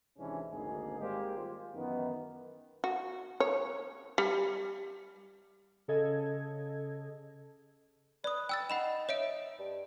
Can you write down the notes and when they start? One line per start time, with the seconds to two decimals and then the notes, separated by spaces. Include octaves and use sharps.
0.18 G#1 C3 E3 G#3 C#4 D4
0.51 G#1 D2 A#3 D#4 G#4 A#4
0.99 G#1 G3 G#3 A#3 G4 C5
1.37 F4
1.74 F#2 D#3 E3 B3
2.84 F#4
3.40 C#5
4.18 G3
5.88 C#3 A4 D#5 G#6
8.24 B4 D5 D#6
8.49 G5 E6 A6
8.70 D#4 F#5 B5 E7
9.09 C#5 E5 D7
9.59 G2